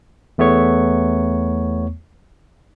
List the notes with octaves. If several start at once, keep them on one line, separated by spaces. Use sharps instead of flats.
E2 A3 B3 C#5 C#6